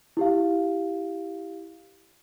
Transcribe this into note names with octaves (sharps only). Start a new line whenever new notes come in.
E4 G4 F5